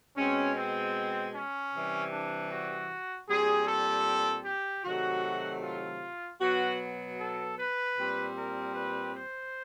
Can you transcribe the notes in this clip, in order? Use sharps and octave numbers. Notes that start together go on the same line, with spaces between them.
B2 G#3 C4 C#4
C4
C#4
C3 E3 G3
D4
F#4
A#2 G3 C4 G#4
A4
G4
C3 D#3 F#3 A3 F#4
F4
B2 F#3 B3 F#4
A4
B4
A#2 G3 C4
A#4
B4
C5